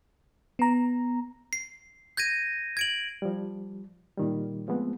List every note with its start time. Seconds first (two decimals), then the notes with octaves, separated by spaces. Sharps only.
0.59 B3 A#5
1.53 C7
2.17 G6 G#6 A#6 D#7
2.77 G#6 D7 F#7
3.22 F3 G3
4.17 A#2 D#3 G3
4.68 F3 G#3 A3 B3 C4